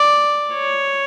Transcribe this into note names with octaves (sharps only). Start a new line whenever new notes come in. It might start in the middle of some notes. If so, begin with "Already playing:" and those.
Already playing: D5
C#5